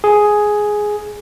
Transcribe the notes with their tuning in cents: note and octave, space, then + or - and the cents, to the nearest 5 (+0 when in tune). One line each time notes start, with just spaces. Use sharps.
G#4 +5